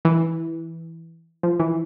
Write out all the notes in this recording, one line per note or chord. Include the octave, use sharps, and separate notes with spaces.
E3
F3
E3